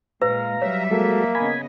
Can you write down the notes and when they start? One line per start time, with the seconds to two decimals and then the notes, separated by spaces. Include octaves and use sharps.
0.22 A#2 G#3 B4 F5 A#5
0.62 F#3 G3 C#5 E5
0.91 G#3 A#3 F#4 A4
1.35 C#3 B3 D#5 G#5 B5